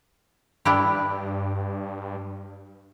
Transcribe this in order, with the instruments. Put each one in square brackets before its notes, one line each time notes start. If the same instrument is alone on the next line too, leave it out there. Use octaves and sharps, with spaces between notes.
[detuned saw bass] G2 [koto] D4 E4 G4